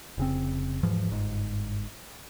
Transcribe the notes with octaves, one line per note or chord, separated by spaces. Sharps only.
F1 C#3 C4
E1 G#2 E3 F3
G1 G#2